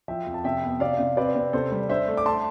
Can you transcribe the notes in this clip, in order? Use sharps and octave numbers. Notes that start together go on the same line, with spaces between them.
F3 E5 G5
F2
A5
C3 E5 G5
B3
C3 D5 F5
C3
C4 B4 D5
C3
C3 A4 C5
G3
D4 C5 E5
A3
D6
A3 A5 C6